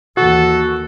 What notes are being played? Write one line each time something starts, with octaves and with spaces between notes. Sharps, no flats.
D#2 E3 F#4 A4